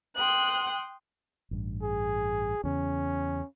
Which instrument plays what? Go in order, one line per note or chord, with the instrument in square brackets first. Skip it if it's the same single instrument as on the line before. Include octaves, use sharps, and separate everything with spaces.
[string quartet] G5 C6 D#6 F#6
[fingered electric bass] A1 G2
[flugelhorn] G#4
[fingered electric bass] E2 C#3 [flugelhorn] C#4